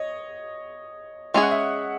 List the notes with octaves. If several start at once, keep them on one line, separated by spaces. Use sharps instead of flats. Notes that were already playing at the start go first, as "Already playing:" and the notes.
Already playing: C#5 D#5
G#3 C#4 G#4 E5
F#5
E5